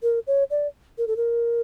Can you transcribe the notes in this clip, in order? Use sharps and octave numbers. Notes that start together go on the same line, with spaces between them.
A#4
C#5
D5
A#4
A4
A#4